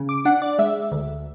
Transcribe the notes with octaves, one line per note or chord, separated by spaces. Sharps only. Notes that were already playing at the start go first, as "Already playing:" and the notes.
Already playing: C#3
D6
D4 F#5
D5
G#3 E5
D2